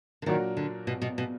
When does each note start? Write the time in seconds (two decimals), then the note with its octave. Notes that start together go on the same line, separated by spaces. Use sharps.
0.22 D3
0.26 A#2 D#3 F#3 D4 F#4 A#4
0.57 D3
0.87 B2
1.02 B2
1.18 B2